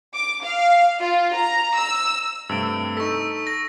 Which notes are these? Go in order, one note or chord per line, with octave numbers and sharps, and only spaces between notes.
D6
F5
F4
A#5
E6
G2 C3 A3 E6 D7
D#4 A4 C#6 B6
A#6